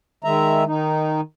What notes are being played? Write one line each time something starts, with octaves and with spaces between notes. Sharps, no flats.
D#3 G#3 E5 A#5
D#3 D#4